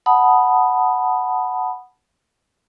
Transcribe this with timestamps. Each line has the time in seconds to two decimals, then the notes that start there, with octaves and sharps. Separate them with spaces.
0.06 F#5 A5 B5 D#6